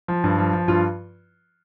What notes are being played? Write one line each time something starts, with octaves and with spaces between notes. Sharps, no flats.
F3
G2
F3
F3
G2 F4